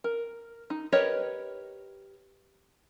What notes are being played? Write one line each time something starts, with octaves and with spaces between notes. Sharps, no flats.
A#4
D#4
G4 A#4 B4 C#5 D#5